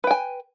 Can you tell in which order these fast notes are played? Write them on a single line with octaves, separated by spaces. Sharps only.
B4 G5 G#5